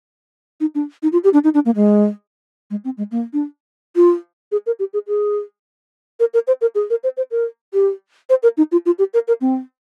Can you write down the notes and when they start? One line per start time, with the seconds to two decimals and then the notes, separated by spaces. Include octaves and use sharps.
0.60 D#4
0.75 D4
1.03 D#4
1.12 F4
1.24 G4
1.33 D4
1.44 D#4
1.54 D4
1.66 A#3
1.76 G#3
2.70 G#3
2.85 C4
2.97 G#3
3.11 A#3
3.33 D4
3.96 F4
4.52 G#4
4.66 A#4
4.79 G4
4.93 G#4
5.08 G#4
6.20 A#4
6.34 A#4
6.47 C5
6.61 A#4
6.75 G#4
6.90 A#4
7.04 C5
7.17 C5
7.31 A#4
7.74 G4
8.30 C5
8.43 A#4
8.57 D#4
8.72 F4
8.86 F4
8.99 G4
9.14 A#4
9.28 A#4
9.41 C4